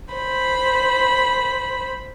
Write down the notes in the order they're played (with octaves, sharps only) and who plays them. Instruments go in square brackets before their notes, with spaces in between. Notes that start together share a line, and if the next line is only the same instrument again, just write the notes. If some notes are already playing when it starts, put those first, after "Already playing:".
[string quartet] C5 B5